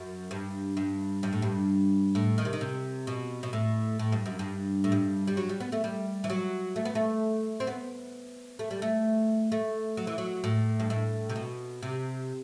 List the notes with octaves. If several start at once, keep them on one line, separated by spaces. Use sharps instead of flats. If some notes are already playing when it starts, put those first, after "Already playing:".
Already playing: F#2
G2
G2
G2
A2
G2
A2
D#3
C3
D#3
C3
B2
B2
A2
A2
G2
F#2
G2
A2
G2
G3
F#3
G3
B3
A3
G3
E3
F#3
A3
B3
A3
C4
B3
A3
G3
A3
A3
F#3
E3
F#3
A2
G2
A2
C3
B2
C3